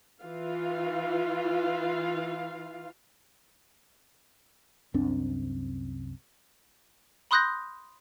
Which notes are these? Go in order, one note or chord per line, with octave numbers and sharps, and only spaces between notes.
E3 F4 F5
C2 F#2 C4 D4
B5 C6 D#6 F#6 G6 A#6